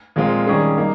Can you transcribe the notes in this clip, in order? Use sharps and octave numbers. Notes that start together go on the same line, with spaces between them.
A#2 F3 G#3 C4 F4
D#3 G3 C#4 G#4
G3 A#3 D#4